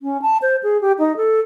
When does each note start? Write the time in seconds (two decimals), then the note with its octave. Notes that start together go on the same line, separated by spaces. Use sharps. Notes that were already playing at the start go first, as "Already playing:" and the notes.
0.02 C#4
0.22 A5
0.42 C5
0.63 G#4
0.81 G4
0.99 D#4
1.17 A4